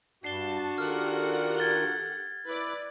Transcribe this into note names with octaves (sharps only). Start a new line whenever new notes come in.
G2 D4 F#4 A5 C7 G7
D#3 F4 G4 A4 A#4 F#5 F6
G#6 A6 G7
E4 B4 D5